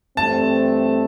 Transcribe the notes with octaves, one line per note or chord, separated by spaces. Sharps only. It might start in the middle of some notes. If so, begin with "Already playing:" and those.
G2 E3 A3 C4 A5